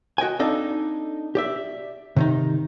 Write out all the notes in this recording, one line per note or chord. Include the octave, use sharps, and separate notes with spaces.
F#4 D#5 G5 G#5
C4 D4 D#4 A4 D#5 F5
G4 D5 E5
C3 D#3 D#4